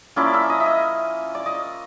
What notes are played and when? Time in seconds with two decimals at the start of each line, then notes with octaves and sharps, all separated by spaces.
0.16 F3 A#3 C#4 E4 D5
0.34 E5
0.50 D#5
0.60 E5
0.66 D#5
1.35 D5
1.46 D#5